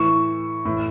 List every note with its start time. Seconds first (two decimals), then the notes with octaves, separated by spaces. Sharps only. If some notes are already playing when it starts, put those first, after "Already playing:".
Already playing: A2 E3 C#6
0.65 A2 E3